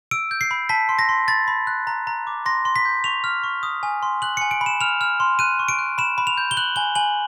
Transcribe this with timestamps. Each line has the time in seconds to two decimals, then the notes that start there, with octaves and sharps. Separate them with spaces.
0.11 E6 D7
0.31 G6
0.41 C7
0.51 B5
0.69 A5 B6
0.89 C6
0.99 A#6
1.09 C6
1.28 B5 A6
1.48 B5
1.67 F#6
1.87 A#5
2.07 A#5
2.27 D6
2.46 C6 A#6
2.65 C6
2.76 B6
2.85 G6
3.04 C#6 F7
3.24 F6
3.44 C#6
3.63 D#6
3.83 G#5
4.03 C6
4.22 F#6 F#7
4.37 C#7
4.41 G#5
4.51 D7
4.61 B5
4.66 E7
4.81 F6 F7
5.01 F6
5.20 C6
5.39 F#6 D#7
5.59 C#6
5.69 D7
5.79 F#6
5.98 B5 E7
6.18 B5
6.27 F7
6.38 G6
6.51 G7
6.57 F#6 F#7
6.76 G#5 G7
6.95 G#5 F#7